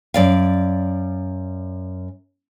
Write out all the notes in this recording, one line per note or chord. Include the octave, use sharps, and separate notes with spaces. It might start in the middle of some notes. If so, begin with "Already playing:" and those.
F#2 D5 F5